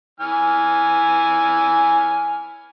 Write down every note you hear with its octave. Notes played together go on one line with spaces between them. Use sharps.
E3 G#5 F6